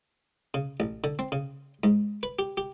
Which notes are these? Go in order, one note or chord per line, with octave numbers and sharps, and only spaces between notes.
C#3
A1
D3
C4
C#3
G#2
B4
G4
G4